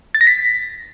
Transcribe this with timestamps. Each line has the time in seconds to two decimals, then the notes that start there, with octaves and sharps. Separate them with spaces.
0.14 A6
0.21 A#6
0.27 B6